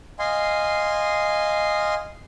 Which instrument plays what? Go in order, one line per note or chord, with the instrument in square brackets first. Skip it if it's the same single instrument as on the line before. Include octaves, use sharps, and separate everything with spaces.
[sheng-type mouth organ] D#5 F5 G#5 C6